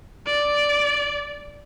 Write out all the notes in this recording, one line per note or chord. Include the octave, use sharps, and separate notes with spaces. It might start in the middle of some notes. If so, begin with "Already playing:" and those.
D5